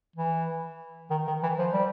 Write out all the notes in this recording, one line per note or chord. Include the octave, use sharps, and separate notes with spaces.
E3
D#3
D#3
E3
F3
G3